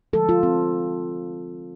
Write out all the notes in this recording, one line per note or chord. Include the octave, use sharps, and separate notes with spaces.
D3 F3 G#3 A4
F4
C4